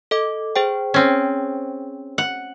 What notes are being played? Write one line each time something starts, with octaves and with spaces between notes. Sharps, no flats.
A4 D#5 D6
G#4 C5 G5
C4 C#4
F#5